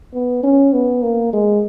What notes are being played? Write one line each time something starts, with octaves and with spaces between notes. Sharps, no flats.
B3
C#4
B3
A#3
G#3